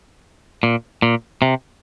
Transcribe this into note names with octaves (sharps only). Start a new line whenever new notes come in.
A#2
A#2
C3